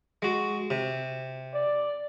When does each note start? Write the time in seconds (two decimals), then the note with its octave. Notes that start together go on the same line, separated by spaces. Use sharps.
0.22 G#3 F#4
0.70 C3
1.54 D5